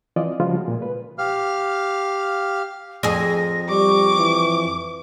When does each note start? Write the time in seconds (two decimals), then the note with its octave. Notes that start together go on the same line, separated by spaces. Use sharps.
0.16 E3 F3 C4 F4 D5 D#5
0.40 C#3 F3 G3 G#3 F4 F#4
0.65 A#2 G#3
0.82 B4
1.18 G4 F5 F6
3.03 F2 G#4 A#6
3.69 G3 C#6 D6
4.18 E3